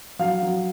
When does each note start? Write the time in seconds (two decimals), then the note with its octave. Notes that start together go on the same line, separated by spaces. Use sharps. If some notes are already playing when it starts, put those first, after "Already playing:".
0.19 F#3 F5
0.43 F#3